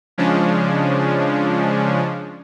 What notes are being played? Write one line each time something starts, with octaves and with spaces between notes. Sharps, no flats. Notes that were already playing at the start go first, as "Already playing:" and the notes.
C#3 F3 G#3 C#4 D4